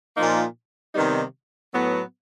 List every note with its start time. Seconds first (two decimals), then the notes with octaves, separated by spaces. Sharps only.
0.15 A#2 F3 A#3 D#4
0.94 C3 D#3 G3 B3 D#4
1.73 A2 F#3 B3